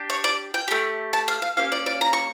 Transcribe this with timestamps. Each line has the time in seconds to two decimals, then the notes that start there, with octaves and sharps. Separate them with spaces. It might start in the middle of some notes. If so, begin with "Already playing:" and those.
Already playing: D4 G4
0.10 C#5
0.24 D5
0.54 G5
0.68 A3 D4 G4
1.13 A5
1.28 F5
1.42 F5
1.57 A#3 C#4 G4 F5
1.72 D5
1.86 D5
2.01 A#5
2.13 C#6